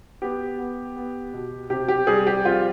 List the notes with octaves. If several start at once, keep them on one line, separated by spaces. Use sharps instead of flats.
B3 G4
B3
B3
B2
C3 G4
G4
G3 G#4
G4
F2 F4